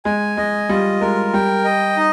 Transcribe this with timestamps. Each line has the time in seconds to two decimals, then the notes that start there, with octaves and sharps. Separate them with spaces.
0.05 G#3 G#5
0.37 G#3 D#5
0.69 G3 F4
1.01 G#3 A#4
1.33 G3 G5
1.65 D#5
1.97 D#4